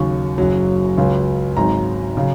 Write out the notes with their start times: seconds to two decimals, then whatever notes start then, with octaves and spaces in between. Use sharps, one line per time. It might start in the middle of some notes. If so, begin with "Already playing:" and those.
Already playing: D#2 C#3 F#3 C#6
0.38 F#1 F#2 F#3
0.98 C#2 C#3 F#3
1.57 G#1 G#2 F#3 A#5
2.17 C#3 F#3